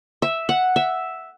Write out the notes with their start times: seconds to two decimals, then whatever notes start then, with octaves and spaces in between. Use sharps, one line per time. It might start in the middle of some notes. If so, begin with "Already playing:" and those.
0.22 E5
0.49 F#5
0.76 E5